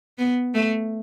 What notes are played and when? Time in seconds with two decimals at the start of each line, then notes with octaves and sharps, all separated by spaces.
0.18 B3
0.54 A3